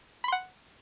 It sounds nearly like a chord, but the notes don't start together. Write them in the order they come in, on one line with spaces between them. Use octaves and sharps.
B5 C6 F#5